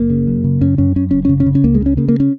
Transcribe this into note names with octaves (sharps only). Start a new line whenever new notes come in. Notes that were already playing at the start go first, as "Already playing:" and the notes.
Already playing: F#1 A#3
C#3
F#2
C#3
F#2 C#4
F#2 C#4
F#2 C#4
F#1 C#4
C#4
C#3
C#4
C#3
C#4
C#2 A#3
G#3
C#3
C#4
C#3 A#3
A#3
C#4